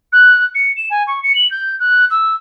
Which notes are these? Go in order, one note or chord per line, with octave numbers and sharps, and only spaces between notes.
F#6
C#7
E7
G#5
C#6
C#7
F#7
G6
F#6
E6